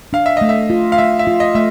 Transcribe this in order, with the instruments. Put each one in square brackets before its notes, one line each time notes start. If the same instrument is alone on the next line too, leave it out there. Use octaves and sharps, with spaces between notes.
[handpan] D4 [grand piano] F5
[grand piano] E5
[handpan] A3 [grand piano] D#5
[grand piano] E5
[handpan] F4
[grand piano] F5
[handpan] A3 [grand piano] E5
[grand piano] E5
[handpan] F4
[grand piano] D#5
[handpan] A3 [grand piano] E5